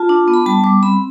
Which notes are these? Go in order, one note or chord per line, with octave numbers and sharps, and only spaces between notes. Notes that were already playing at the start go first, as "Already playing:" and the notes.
Already playing: F4 A5
D4
B3
B5
G3 A5
G3 D6
C4 B5